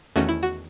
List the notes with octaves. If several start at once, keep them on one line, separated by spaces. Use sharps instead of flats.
E2 D#3 A3 C#4 F#4
E4
F#4